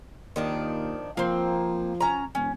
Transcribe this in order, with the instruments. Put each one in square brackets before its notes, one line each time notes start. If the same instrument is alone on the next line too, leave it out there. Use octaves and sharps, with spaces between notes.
[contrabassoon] D#2 [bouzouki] D#3 F3 D4
[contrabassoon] F3 [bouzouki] A#3 C4
[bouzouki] C#4 A#5
[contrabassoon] E1 [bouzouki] C#4